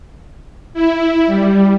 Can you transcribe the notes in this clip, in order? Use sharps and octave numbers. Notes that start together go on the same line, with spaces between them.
E4
G3